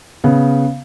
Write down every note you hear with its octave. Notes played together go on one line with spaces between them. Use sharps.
C#3 B3